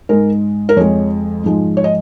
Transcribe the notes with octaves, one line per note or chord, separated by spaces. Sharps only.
G#2 G#3 A#4
A#4
F2 F3 G#3 C#5
G#2 F3 G#3
C#5
D#5